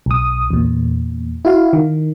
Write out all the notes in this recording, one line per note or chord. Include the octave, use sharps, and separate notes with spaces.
B1 D#6
E2 A#2
E4 F#4 F5
D#3